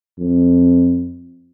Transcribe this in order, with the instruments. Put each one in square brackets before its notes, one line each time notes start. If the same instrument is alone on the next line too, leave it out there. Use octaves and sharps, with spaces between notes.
[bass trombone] F2